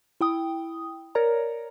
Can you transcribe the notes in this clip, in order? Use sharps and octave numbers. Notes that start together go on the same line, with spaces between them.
E4 G5 D#6
A#4 C#5 D5 A#5